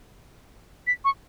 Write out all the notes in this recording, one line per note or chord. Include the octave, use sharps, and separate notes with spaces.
B6
C#6